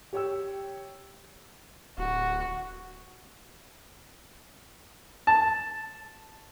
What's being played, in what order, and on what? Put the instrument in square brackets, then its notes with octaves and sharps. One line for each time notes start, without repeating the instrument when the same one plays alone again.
[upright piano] G4 C#5 G5 E6
[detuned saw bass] D1 [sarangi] F#4
[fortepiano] A5